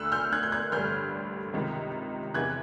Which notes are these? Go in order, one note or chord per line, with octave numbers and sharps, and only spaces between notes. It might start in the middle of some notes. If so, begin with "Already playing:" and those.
Already playing: D2 D3 E6 F#6
F6 G6
F#6 G#6
G6
F#6 G#6
A1 G2 D3 F6 G6
C#2 C3 D#3
E2 C3 E3 F#6 G#6